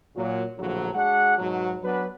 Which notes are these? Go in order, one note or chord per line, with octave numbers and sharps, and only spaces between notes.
A#2 F#3
A#1 A2 D3 F3 F#3
G#3 D4 F#4 G#4 F#5
G#2 B2 F#3
F#3 B3 D4 B4